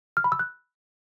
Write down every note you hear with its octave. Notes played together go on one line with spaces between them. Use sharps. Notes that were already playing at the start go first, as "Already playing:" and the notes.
F6
B5
E6
F#6